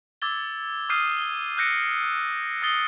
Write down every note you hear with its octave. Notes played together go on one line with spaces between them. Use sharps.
D6 E6 G#6 A6 G7
D6 D#6 F6 G6 C7 D#7
G7
E6 F#6 G6 A#6 C#7 D7
D#6 A6 C7 G7